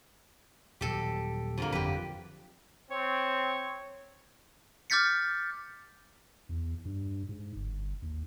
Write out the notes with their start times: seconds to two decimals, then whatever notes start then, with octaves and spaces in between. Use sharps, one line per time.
0.81 D#1 F#3 G4 A4
1.58 F2 D3 A#3
1.72 G1 F2 F#3 G4 B4
2.91 C4 C#5
4.90 D6 F6 G6 A6 B6 C#7
6.49 E2
6.85 G2
7.29 G#2
7.56 G1
8.02 D#2